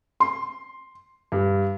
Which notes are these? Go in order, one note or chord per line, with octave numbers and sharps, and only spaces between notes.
C6
G2